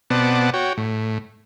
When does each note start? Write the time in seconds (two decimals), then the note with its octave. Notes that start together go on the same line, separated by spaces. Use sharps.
0.10 B2 B3 C4 D5 F#5 A5
0.54 F#4 C#5 G5
0.77 A2